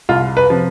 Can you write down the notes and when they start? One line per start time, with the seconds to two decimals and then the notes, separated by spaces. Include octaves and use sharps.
0.09 C2 F4
0.37 B4
0.50 C3 F3